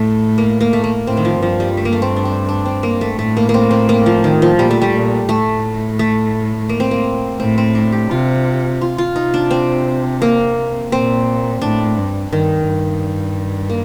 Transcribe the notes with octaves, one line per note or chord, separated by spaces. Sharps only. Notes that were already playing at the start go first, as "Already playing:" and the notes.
Already playing: A2 A3
A#3
A#3
A3
A#3
A2 C4
D#3
F3
G2 F3
G3
A3
A#3
A3
C4
D4
C4
D4
C4
A#3
A3
A2 A3
A#3
A#3
C4
C4
A#3
F3
D#3
F3
A#2 G3
A3
G3
A#2
A2 A3
A3
A#3
C4
A#3
A2 C4
C4
D4
G4
C3 F4
F4
F4
C3 D#4
D4
C4
A#3
A#2 C4
A2 D4
G2
G2 D#3
G2
A#3